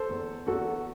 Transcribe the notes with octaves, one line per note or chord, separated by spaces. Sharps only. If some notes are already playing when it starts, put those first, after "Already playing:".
Already playing: A4 C5
E2
E2 F#4 A4